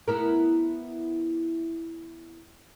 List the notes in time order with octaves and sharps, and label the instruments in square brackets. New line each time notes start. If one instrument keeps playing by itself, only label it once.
[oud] B3 E4 A#4